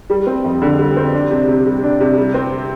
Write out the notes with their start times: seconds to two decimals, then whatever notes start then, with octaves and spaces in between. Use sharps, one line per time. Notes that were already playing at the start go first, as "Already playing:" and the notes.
0.10 G3
0.27 C4
0.44 F2
0.62 D3
0.79 G3
0.97 C4
1.13 D4
1.31 C3
1.48 C3
1.66 G3
1.83 D4
2.00 C3
2.17 G3
2.34 C4